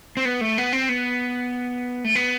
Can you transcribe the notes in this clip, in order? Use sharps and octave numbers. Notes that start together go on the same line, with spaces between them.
C4
B3
A3
B3
C4
B3
A3
B3